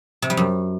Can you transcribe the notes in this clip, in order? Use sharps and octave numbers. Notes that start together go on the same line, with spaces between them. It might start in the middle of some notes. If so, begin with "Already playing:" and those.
C3
G3
F#2